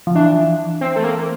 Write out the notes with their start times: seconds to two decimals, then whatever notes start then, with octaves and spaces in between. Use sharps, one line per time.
0.07 F3
0.15 E3 D4
0.81 C4
0.96 A3
1.04 A#3